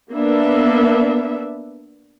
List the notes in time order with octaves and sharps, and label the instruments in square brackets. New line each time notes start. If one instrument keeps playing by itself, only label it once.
[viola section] A#3 B3 D4 E5